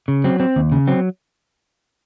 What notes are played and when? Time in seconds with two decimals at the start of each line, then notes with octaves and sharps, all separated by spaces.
0.08 C#3
0.24 F#3 C4
0.40 C4
0.56 D#2
0.72 C#3
0.87 F#3 C4